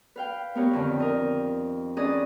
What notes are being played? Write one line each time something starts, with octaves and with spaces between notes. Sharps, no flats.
B4 F5 G5
B3 D#4 G4 A#4 B4 C#5
F2 D3 D#3
A#4 D#5
C#4 D#4 G#4 B4 D5 D#5